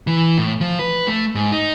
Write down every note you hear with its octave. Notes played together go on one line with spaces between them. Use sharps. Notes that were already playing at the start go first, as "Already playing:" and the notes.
E3
A2
F3
B4
A3
G#2
D#4